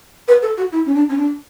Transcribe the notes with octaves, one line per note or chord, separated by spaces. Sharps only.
B4
A4
F#4
E4
C#4
D4
C#4
D4